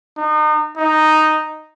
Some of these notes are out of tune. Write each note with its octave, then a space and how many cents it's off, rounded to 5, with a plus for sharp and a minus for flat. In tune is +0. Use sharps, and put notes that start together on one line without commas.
D#4 -35
D#4 -5